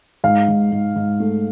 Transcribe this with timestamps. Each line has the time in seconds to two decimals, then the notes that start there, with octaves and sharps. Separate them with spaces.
0.24 G#2 F5
0.48 G#2
0.72 G#2
0.96 G#2
1.20 A3